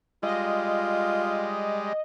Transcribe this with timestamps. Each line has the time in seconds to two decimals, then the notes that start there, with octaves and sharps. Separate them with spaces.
0.23 G3 G#3 F4 D#5